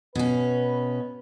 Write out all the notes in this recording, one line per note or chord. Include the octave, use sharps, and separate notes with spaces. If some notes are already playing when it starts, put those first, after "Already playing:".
B2 C#4 B4